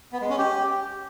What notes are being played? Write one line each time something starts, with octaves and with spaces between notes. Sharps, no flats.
B3
G#3
C#4
G4